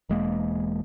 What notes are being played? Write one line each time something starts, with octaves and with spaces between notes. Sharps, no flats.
E1 E2 G#3 A#3